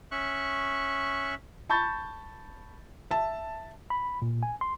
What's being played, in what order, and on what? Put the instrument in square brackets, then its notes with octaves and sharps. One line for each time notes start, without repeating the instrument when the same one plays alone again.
[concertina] C#4 E5 C#6 F#6
[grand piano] A5 B5 C#6 G6 A6
[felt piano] E5 A5
[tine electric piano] B5
A#2
G#5
C6